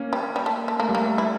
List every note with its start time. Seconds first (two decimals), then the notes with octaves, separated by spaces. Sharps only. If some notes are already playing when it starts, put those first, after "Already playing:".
Already playing: A#3 C#4
0.13 G3
0.36 G3
0.46 A3
0.68 A3
0.80 A3 A#3
0.89 G3
0.95 A3 A#3
1.18 E4